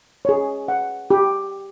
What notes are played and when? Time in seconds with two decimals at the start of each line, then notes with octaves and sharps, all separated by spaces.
0.25 G#4 C#5
0.68 F#5
1.11 G4